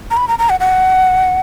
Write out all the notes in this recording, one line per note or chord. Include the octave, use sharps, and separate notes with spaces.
A#5
B5
A#5
A#5
F#5
F#5